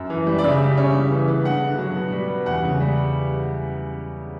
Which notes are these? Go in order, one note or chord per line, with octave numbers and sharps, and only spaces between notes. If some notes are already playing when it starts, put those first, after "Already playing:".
Already playing: F#2
E3
G3
D5
C#3 E5
G3
C#4
C#3
E3
B3
G2 F#5
D3
F#3
B2
G3
B3
E2 F#5
C#3
G3